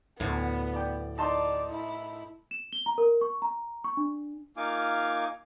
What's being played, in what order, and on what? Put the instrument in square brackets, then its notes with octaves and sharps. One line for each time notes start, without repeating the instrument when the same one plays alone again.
[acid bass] D2 [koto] A2 [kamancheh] B3
[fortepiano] D5 G5
[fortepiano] D#4 A5 C6 [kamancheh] D5
[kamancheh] E4
[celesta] E7
G7
A#5
A#4
C#6
A#5
C#6
D4
[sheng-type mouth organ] A#3 D#4 F4 F5 G#5 D6